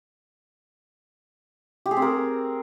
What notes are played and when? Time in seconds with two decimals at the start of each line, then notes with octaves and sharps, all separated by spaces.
1.86 G4
1.91 G#4
1.97 C4
2.02 A#4